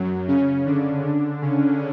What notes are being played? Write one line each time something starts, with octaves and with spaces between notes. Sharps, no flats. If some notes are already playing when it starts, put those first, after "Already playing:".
Already playing: F#2 F#3
C#3 C#4
D3 D4
D3 D4
C#3 C#4